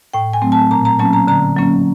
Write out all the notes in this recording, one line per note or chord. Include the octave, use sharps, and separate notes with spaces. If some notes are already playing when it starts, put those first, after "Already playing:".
A2 G5
G#5
F#3 A3 C4
A5
A#2 A#5
A#5
F#3 A#3 C#4 A5
A#5
D3 A#5
F#3 A#3 C#4